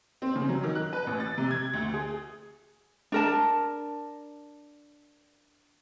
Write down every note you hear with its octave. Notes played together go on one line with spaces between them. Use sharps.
C4
C#3
F#3
D#3
F#6
B4
A1
A6
C3
G#6
D2
G#4
D4 A#4 A5